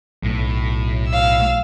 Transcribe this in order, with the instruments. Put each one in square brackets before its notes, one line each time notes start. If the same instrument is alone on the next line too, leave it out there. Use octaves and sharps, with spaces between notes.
[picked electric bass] B1 [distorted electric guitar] A2
[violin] F5 E6